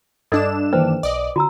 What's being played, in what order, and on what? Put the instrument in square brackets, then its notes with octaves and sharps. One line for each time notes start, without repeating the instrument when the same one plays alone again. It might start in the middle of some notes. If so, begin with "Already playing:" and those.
[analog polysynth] G2 D4 E7 [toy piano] A4 D5 D#5 [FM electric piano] E6 F#6
[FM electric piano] D#3 E3 A#3 [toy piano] B4 C5 G5
[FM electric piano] B1 [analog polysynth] D5 D#5
[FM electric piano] D3 [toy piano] F#4 A#5 E6